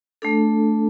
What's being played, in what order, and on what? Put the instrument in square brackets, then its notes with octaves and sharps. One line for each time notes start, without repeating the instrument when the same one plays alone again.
[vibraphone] A3 D4 A4